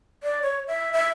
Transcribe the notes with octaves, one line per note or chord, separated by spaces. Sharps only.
D5
C#5
E5
E5